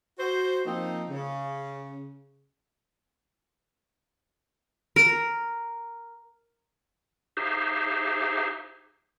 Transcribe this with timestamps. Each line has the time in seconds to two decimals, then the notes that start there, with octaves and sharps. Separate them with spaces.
0.18 F#4 C5
0.66 F3 A#3 C4 D#4
1.10 C#3
4.96 A#4
7.37 D#4 G4 G#4 C5 E5 F5